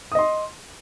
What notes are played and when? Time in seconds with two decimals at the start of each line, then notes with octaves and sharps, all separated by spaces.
0.12 D#6
0.15 D#5
0.19 C6